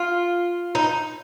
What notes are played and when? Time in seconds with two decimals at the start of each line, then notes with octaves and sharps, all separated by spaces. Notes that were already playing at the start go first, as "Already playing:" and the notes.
Already playing: F4
0.75 D#4